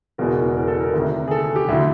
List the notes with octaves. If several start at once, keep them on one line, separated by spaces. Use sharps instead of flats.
F#1 E2 B2 G#3 A#4
A#4
A4
A#4
D2 C3 D#3
G#4
A4
G4
D2 D3 F#3 E4